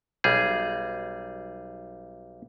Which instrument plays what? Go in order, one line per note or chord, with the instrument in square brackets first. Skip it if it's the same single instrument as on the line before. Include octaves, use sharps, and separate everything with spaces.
[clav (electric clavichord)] B1 G3 G#4